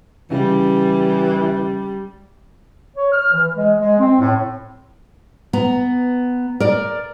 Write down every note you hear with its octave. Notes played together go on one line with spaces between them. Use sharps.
C#3 E3 G3
C#5
F6
E3
G#3
G#3
C4
A2
B3 A#5
A#4 D5